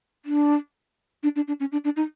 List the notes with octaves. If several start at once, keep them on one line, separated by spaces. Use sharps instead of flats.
D4
D4
D4
D4
C#4
D4
D4
D#4